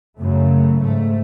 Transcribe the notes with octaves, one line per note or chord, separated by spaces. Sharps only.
F#2 C#3 A3
G#2 A3